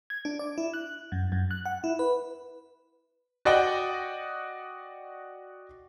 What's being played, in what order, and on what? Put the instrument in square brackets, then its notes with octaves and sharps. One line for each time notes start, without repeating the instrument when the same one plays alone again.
[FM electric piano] G#6
D4
D5
E4
F#6
F#2
F#2
F#6
F#5
E4
B4
[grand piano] F#4 D5 D#5 F#5 G5